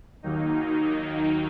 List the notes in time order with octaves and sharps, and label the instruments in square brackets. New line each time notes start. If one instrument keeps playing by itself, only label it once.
[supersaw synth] D#2 D#3 F#3 A#3 D#4